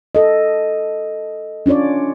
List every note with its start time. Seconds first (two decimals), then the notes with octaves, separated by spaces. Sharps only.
0.15 A4 D#5
1.66 C#4 D4 F4 C#5 D5